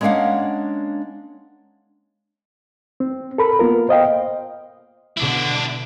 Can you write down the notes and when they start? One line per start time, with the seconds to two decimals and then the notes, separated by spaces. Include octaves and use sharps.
0.01 G#3 A#3 C#4 D4 F5 F#5
3.00 C4
3.38 A4 A#4 B5
3.59 A#3 B3 F4 A#4
3.89 C5 D#5 F5 G5
5.17 B2 D3 D4 E4